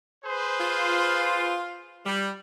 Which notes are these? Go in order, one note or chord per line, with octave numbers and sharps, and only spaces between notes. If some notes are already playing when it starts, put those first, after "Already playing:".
G#4 B4 C5
F4
G3